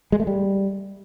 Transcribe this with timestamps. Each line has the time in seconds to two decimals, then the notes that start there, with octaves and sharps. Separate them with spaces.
0.12 G#3
0.20 A3
0.27 G3